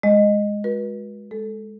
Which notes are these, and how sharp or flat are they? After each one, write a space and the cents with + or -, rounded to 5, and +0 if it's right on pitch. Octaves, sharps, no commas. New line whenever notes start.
G#3 +0 D#5 -10
F#4 -20 B4 -40
G#3 +0 A4 -5